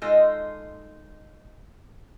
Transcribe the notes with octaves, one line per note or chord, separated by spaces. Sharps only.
G#3 D#4 F4 A4 D#5